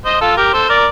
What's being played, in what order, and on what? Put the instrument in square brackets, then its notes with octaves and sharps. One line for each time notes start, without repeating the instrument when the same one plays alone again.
[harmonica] C5 D#5
F4 A4
G4 A#4
A4 C5
A#4 D5